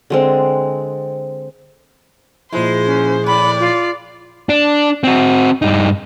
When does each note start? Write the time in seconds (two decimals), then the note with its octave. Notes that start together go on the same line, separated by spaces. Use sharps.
0.10 D3 G#3 C4
2.53 A#2 F3 G#3 E4 C5
2.86 C#4
3.26 A2 D5 B5
3.59 F4
4.49 D4
5.04 C4 F#4
5.62 G2 D#4